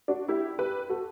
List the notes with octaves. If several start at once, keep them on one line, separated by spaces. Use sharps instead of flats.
D4 F#4
E4 G4
G4 B4
F#4 A4